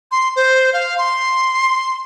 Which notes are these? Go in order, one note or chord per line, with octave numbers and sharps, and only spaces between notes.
C6
C5
F5
C6